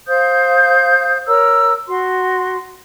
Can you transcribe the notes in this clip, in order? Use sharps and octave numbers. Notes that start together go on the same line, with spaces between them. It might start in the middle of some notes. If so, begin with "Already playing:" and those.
C5 F5 D#6 G6
A#4 C#5 A#5 E6
F#4 C6